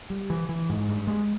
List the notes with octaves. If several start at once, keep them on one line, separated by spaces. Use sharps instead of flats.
G3
E3
E3
G#2
G2
G#3